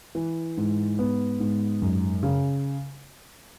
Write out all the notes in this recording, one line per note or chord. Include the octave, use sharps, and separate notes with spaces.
E3
G#2
B3
G#2
F#2
C#3